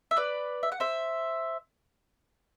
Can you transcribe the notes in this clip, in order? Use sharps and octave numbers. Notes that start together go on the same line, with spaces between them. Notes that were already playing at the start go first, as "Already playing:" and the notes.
E5
B4 D5
E5
F#5
C5 E5